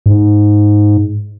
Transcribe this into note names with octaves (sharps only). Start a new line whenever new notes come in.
G#2